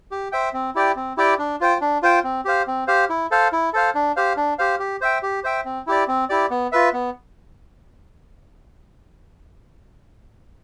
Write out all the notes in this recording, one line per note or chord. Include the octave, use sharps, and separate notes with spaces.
G4
C5 E5 G5
C4
E4 G4 D5 G5
C4
E4 G4 D5 G5
D4
F4 C5 G5
D4
F4 C5 G5
C4
G4 C5 F5
C4
G4 C5 F5
E4
A4 C5 F5
E4
A4 C5 F5
D4
G4 C5 F5
D4
G4 C5 F5
G4
C5 E5 G5
G4
C5 E5 G5
C4
E4 G4 D5
C4
E4 G4 D5
B3
F4 B4 E5
B3